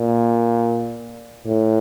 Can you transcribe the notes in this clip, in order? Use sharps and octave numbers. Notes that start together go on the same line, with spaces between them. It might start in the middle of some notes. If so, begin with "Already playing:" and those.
Already playing: A#2
A2